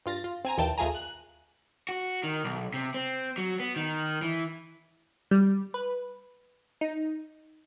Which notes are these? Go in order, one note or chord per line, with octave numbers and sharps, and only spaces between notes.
G2 F4 A6 A#6
F4
C4 G#5 A#5
D#2 A#2 E3 G5 A5
D#2 A3 F4 G#4 G#5 A#5
F#6
F#4
D#3
B1
C3
C4
F#3
B3
D#3
E3
G3
B4
D#4